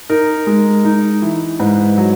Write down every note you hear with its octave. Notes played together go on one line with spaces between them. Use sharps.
D#4 A#4
G#3
D#4
E3
G#2 B4
F#3